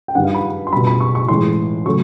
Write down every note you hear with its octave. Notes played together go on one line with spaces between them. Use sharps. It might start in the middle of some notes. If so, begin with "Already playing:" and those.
G5
G2 D#3 G3 F#5
F5
B5
C6
B2 G3 B5
B5
C#6
C#6
A2 E3 G#3 C6
C#3 F#3 A3 C#6